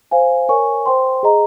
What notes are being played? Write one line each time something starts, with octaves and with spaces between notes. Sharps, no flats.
C5 F5 G#5
A#4 C#5 G#5 C#6
C5 G5 C6
G#4 D#5 A#5